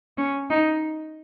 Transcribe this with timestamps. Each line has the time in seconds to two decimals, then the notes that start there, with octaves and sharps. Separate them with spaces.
0.18 C#4
0.50 D#4